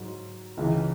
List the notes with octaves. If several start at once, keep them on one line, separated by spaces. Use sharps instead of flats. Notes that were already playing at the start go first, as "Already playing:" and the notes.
Already playing: G#2 F#3
C#2 C#3 E3